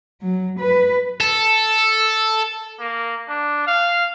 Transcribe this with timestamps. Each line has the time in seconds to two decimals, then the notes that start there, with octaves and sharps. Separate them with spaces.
0.22 F#3
0.59 B4
1.21 A4
2.79 A#3
3.28 D4
3.67 F5